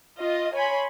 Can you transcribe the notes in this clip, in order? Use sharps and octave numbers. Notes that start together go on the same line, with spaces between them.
F4 D#5
C#5 G#5 B5 C6